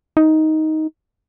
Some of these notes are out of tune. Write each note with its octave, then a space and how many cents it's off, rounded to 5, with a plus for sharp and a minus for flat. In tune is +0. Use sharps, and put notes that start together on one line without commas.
D#4 +10